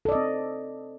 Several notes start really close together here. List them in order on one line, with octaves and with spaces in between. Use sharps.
A4 D5 D#5 C4